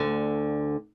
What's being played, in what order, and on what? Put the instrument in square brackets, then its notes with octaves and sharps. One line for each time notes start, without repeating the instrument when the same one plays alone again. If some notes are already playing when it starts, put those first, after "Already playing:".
Already playing: [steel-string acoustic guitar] D2 D3